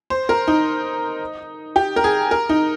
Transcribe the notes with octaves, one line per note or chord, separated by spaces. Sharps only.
C5
A#4
D#4
G4
A#4
G#4
A#4
D#4